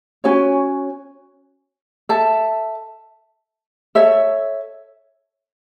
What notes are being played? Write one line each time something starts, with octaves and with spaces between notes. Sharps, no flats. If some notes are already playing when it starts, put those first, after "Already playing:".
C#4 F#4 C#5 G#5
A4 E5 A5
A4 C#5 E5